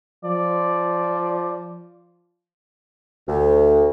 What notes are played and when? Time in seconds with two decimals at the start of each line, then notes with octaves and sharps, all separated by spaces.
0.24 F3 D5
3.28 D2